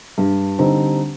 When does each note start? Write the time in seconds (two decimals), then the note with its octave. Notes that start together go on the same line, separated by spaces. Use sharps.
0.18 G2
0.58 D3 G3 C4 D#4